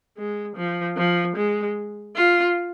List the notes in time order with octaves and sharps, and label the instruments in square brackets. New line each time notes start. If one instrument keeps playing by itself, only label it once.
[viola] G#3
F3
F3
G#3
F4